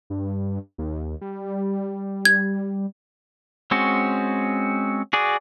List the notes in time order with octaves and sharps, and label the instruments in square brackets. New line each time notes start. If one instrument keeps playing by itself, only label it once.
[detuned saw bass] G2
D#2
G3
[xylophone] G#6
[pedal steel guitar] G#3 C4 C#4 F#4
F#4 G#4 D5